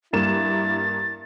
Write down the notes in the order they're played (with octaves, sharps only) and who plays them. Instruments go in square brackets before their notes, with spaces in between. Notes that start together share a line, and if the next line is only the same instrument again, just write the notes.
[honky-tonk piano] G2 A#3 E7 [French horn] E4 [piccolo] A6